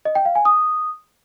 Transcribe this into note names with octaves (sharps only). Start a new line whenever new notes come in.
D#5
G5
F5
G#5
D#6